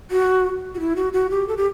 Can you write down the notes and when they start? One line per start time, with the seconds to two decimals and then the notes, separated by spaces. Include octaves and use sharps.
0.11 F#4
0.75 F#4
0.80 E4
0.96 F#4
1.13 F#4
1.30 G4
1.48 A4
1.57 G4